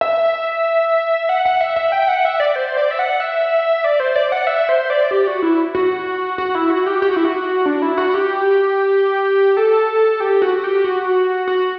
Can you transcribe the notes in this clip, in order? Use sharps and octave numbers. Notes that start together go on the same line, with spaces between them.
E5
F#5
F#5
E5
E5
G5
G5
F#5
E5
D5
C5
D5
E5
F#5
E5
D5
C5
D5
F#5
E5
C5
D5
G4
F#4
E4
F#4
F#4
E4
F#4
G4
G4
F#4
E4
F#4
D4
E4
F#4
G4
A4
G4
F#4
G4
F#4
F#4